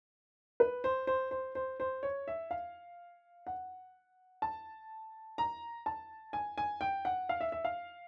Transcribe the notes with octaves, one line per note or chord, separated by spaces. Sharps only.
B4
C5
C5
C5
C5
C5
C#5
E5
F5
F#5
A5
A#5
A5
G#5
G#5
G5
F#5
F5
E5
E5
F5